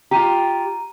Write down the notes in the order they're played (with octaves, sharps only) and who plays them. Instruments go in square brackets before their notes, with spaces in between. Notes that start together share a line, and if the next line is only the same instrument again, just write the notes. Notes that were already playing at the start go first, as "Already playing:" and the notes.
[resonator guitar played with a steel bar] F4 G4 [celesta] A#5 D#7